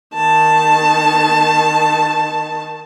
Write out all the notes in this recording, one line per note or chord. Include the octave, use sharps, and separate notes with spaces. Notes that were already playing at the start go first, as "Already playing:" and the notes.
D#3 A5